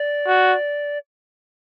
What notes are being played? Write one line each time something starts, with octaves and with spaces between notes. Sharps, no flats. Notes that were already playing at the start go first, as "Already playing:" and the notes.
Already playing: D5
F#4